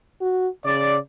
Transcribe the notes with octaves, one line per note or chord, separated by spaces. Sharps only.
F#4
C#3 D5